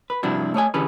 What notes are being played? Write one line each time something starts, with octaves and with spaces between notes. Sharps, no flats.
B4
G2 C3 F3 D4 E4 F#4
A3 C#5 D#5 G#5
D3 E3 C#4 G4 G#4 B4